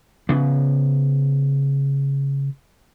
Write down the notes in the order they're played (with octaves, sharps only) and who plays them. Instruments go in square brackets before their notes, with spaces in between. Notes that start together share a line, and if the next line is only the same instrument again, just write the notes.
[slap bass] C#3 B3